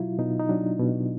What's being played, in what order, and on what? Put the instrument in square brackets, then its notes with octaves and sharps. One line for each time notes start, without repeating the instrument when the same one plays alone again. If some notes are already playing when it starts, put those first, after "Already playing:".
Already playing: [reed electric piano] B2 F#3 E4 F4
B2 D#4
D#4
F#3 D4
B2